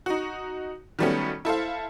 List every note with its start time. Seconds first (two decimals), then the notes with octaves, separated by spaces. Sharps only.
0.06 D#4 F#4
0.99 D#3 F#3 G3 A3 B3 C#4
1.45 E4 A4 C5 F5